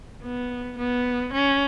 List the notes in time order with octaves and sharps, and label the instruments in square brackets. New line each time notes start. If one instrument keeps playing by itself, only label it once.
[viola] B3
B3
C#4